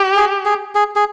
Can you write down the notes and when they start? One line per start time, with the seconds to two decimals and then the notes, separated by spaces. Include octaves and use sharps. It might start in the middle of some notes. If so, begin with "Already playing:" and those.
Already playing: G4
0.16 G#4
0.45 G#4
0.75 G#4
0.96 G#4